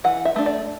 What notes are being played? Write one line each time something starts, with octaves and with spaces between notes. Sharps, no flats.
E3 F#5
E5
A3 D4
D5